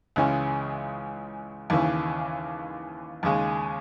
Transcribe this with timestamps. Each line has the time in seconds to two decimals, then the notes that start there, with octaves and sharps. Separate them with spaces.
0.16 C#2 C#3 E3 G#3 C#4
1.70 D#2 C#3 E3
3.23 D#2 C#3 G#3